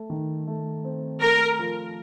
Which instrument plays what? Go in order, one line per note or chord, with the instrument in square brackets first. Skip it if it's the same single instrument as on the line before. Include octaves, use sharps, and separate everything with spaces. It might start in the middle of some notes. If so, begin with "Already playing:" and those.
Already playing: [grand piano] A3
D#3
A3
C4
[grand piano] A3 [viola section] A#4
[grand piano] F3